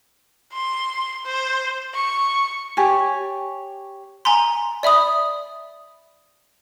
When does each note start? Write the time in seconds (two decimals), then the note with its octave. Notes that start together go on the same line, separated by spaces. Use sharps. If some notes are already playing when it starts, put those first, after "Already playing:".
0.53 C6
1.26 C5
1.95 C#6
2.77 G4 C#5 G#5 A5
4.25 G#5 A#5 C6
4.83 D5 E5 B5 D#6